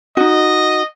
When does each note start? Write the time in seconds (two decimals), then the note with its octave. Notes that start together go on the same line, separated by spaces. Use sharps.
0.17 D#4 F#4 D#5